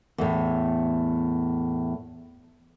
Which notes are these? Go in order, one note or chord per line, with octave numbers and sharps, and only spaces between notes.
E2 A2